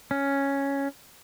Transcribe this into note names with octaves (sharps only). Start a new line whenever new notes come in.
C#4